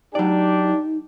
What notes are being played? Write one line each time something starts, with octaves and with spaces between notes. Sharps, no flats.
F#3 D4 D#4 G4 D5